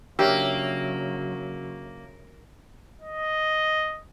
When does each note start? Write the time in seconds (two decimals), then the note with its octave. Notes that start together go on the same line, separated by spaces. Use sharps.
0.19 C#3 F#3 A#3 D4 G4 C#5 E5 E6
3.01 D#5